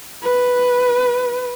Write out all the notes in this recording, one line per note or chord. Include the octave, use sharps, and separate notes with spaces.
B4